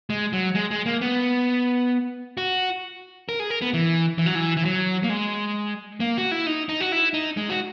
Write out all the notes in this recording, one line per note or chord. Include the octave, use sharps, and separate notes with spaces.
G#3
F#3
G#3
G#3
A#3
B3
F#4
A#4
G#4
A#4
B3
E3
E3
F#3
E3
E3
F#3
A#3
G#3
A#3
F#4
E4
D#4
D#4
F#4
E4
D#4
G#3
F#4